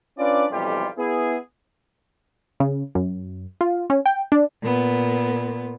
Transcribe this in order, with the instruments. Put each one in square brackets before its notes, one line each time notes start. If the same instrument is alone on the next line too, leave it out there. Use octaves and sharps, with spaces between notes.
[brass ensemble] C#4 D4 F4 B4 D5
B1 F2 E3 G3 F4 G4
B3 E4 G#4
[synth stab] C#3
F#2
F4
C#4
G5
D4
[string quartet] A#2 B3